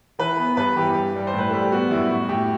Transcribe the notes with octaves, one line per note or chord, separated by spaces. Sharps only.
E3 B4
B3
G2 B4
E3 G4
G2
G3
C5
A2 B4
G3 A4
G4
B3 F#4
F#2 E4
A2 F#4
A2 G4